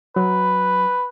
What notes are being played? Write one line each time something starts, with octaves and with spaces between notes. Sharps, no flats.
F#3 B4